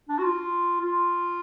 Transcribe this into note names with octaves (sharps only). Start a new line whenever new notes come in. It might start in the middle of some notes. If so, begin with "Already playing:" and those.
D4
F#4
F4
F4